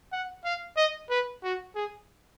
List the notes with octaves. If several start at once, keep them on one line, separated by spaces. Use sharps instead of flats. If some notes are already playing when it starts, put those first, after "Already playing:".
F#5
F5
D#5
B4
F#4
G#4